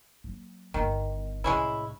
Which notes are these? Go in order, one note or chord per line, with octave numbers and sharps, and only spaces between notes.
F#3 A#3
G1 D#3 B3
C2 A2 G#3 C#4 E4